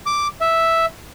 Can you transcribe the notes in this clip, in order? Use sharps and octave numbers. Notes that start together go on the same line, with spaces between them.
D6
E5